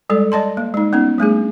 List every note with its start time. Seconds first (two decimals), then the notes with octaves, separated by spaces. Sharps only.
0.10 G3 G#3 A4 D5
0.32 D5 D#5 A5 C6
0.57 A#3
0.74 G#3 D#4
0.93 B3 C#4 D#4
1.18 G3 A3 D4 G#4